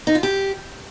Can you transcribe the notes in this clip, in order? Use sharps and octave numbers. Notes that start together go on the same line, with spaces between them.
D#4
F4
G4